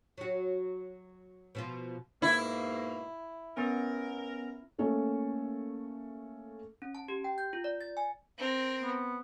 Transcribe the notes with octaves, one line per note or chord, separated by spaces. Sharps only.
F#3 F#4
B2 F3 F4
G#2 B2 A#3 E4
B3 C#4 A#4
A3 A#3 C#4 A4
C#4
A5
G4
G5
G6
F4
D5
A6
G#5
C4 A#4
B3